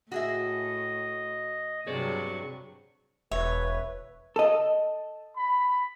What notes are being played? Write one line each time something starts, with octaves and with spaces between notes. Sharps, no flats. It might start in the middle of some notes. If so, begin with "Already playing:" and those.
A2 F#4 G#4 D#5 E5
G2 C3 F#3 G#4 C5 D5 C#6
E1 B4 C#5 E5
A4 D#5
B5